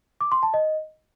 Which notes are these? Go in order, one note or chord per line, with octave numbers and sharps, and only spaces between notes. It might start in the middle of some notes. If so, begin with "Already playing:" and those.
D6
C6
A5
D#5